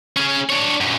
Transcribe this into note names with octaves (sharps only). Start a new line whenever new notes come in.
C#4 G#4
D4 C#5
F#2 A#2